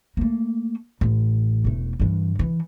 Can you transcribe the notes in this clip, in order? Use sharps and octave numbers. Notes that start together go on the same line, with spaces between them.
A3 A#3
A1
E1 A3
G2 E3
E3